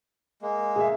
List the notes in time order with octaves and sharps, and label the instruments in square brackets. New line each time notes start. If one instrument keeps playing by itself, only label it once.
[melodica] G#3 A#3
[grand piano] G#4 E5